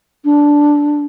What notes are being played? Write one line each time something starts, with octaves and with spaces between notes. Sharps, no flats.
D4